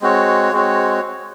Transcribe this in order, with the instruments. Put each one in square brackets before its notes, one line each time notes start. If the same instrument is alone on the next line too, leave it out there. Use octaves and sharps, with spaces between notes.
[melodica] G#3 C4 F#4 C#5
G#3 C4 F#4 C#5